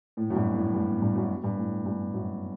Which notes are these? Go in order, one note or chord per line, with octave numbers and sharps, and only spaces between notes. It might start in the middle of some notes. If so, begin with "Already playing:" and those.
A2
F#2
G2
A2
G2
G2
F#2
G2
A2
G2
F#2